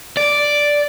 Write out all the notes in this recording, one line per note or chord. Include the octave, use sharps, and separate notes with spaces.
D5